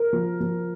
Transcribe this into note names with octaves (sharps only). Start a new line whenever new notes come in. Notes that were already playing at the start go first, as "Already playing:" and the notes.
Already playing: A#4
F3
F3